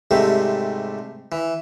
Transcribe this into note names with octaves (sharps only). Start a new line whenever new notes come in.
G#2 C3 G3 A3
E3